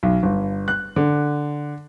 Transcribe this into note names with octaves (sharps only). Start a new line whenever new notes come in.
B1
G1
F#6
D3